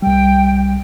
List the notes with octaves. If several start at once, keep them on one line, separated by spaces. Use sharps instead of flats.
C2 G3 G5